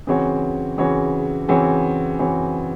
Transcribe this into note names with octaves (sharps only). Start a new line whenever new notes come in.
C#3 E3 C4 F#4 C#5
C#3 E3 C4 F#4 C#5
C#3 E3 C4 F#4 C#5
C#3 E3 C4 F#4 C#5